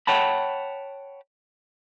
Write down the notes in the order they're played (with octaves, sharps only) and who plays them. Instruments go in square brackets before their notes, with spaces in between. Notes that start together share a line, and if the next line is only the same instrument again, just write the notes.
[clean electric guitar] C#5 F#5 G5 A5 B5